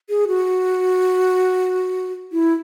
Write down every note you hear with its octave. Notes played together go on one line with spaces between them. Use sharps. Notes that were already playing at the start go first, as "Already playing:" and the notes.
G#4
F#4
E4